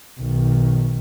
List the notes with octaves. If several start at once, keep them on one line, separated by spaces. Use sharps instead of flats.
B1 D#3